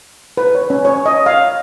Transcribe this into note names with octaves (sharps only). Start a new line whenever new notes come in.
B4
C#5
C#4
C#5
D#5
F5